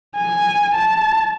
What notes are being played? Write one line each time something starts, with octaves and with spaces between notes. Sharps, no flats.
G#5
A5